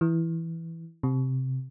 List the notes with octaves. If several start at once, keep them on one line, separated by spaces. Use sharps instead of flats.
E3
C3